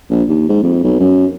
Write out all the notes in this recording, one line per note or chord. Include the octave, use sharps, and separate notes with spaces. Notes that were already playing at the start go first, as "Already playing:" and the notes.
A#1
D#2
G#2
F2
B1
F#2